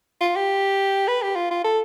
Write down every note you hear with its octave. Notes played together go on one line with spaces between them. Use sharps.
F4
G4
B4
G4
F4
F4
A4